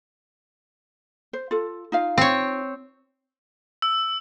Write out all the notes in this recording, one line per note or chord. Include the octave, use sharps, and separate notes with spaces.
C5
F4 A4
D#4 F4 F5
C4 C#5
E6